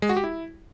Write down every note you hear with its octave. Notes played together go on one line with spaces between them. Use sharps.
G#3
F#4
G4
E4